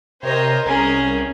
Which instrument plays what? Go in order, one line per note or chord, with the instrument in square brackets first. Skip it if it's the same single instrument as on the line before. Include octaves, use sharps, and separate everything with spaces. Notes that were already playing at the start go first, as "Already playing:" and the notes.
[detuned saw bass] C3 [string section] A#4 C5 D#5 [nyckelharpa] C#5
[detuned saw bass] C2 [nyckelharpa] C#4 [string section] G#4 A#4